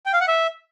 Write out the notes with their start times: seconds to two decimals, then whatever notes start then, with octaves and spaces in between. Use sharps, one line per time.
0.06 G5
0.13 F5
0.21 F#5
0.28 E5